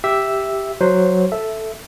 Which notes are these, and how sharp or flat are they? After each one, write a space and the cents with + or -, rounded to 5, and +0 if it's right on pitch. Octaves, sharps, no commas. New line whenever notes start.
G4 +0 E5 +0
F#3 +0 C5 +0
A4 +0 E5 +0